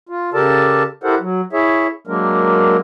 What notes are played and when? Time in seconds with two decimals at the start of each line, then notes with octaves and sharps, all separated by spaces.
0.09 F4
0.34 C#3 G4 A4 A#4 D5 A5
1.03 E4 G4 A4 A#4 C5 F#5
1.20 F#3
1.53 E4 G#4 C#5 E5
2.07 F#3 G#3 A#3 D4 A#4